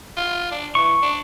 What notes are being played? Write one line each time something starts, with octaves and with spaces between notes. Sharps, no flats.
F4
D4
E3 C#6
D4